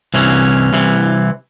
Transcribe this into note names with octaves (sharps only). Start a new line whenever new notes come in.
C2 C3 E3 C#4
C2 C3 E3